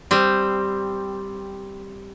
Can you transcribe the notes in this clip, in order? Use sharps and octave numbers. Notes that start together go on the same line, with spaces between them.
G3 C4